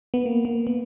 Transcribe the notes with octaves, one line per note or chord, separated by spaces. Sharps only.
B3
A#3
A#3
B3